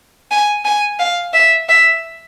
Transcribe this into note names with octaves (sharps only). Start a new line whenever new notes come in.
G#5
G#5
F5
E5
E5